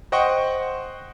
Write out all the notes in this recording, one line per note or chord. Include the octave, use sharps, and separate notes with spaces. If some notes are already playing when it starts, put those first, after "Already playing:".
C5 D#5 F#5 G5 C#6